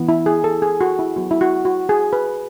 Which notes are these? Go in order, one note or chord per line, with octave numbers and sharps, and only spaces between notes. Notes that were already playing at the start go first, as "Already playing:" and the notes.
Already playing: E3 B3
E4
G#4
A4
G#4
F#4
E4
F#3 B3 F#4
E4
F#4
F#4
G#4
B4